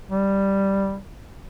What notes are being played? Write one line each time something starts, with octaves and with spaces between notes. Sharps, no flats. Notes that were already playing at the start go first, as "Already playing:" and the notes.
G3